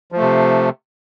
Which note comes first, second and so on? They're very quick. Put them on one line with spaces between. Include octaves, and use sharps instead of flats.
F3 A3 C3